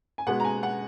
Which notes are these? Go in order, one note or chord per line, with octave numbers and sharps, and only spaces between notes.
G#5
B2 G#3 B3 F#5
A#5
G#5
F#5